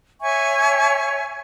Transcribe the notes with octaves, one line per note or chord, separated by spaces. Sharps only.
C#5 E5 G#5 C#6